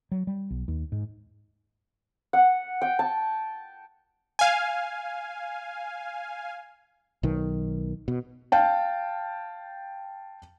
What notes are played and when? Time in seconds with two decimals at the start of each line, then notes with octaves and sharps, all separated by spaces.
0.12 F#3
0.27 G3
0.50 B1
0.68 D#2
0.92 G#2
2.33 F#5
2.82 G5
2.99 A5
4.39 F5 G#5
7.23 B1 D#3
8.08 B2
8.52 F5 G5 A5